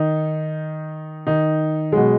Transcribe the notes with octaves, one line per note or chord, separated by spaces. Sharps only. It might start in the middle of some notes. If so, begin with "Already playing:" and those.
Already playing: D#3 D#4
D#3 D#4
B2 F#3 G#3